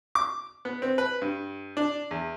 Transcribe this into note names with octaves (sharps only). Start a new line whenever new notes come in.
D6
B3
C4
B4
G2
D4
E2